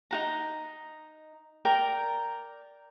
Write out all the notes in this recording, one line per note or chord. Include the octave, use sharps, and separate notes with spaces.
D#4 F#4 A#5
A#4 D5 G5 A#5